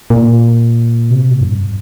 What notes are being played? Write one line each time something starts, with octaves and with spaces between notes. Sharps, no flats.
A#2
C3
A#2
F#2
G2